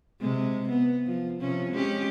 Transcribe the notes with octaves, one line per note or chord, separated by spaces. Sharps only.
C3 G#3
B3
F3
C3 F3 C#4
G#3 C#4 G4